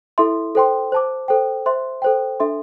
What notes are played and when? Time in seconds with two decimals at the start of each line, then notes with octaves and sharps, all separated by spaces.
0.18 E4 A4 E5 C6
0.55 A4 C5 G5 C6
0.92 C5 A5 D6
1.28 A4 C5 G5
1.66 C5 E5 C6
2.02 A4 C5 G5
2.40 D4 A4 E5 C6